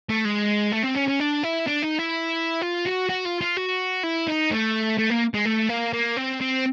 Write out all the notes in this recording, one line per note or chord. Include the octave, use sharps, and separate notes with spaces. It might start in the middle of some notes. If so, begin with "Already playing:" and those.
A3
G#3
A3
C4
C#4
C#4
D4
E4
D4
D#4
E4
F4
F#4
F#4
F4
F4
F#4
E4
D#4
A3
A3
A#3
G#3
A3
A#3
A#3
C4
C4